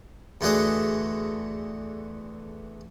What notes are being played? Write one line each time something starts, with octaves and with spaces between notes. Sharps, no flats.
E2 D3 A3 F#4 G#4 D#5